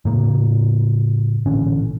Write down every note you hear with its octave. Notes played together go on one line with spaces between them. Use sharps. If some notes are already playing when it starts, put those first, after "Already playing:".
A2 C#3 A#3
A1 A#2 D3 C#4